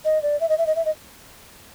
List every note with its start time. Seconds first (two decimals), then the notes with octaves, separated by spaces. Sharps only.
0.05 D#5
0.23 D5
0.41 E5
0.49 D#5
0.58 E5
0.67 D#5
0.76 E5
0.85 D#5